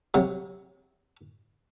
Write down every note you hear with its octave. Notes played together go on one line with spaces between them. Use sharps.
C3 F#3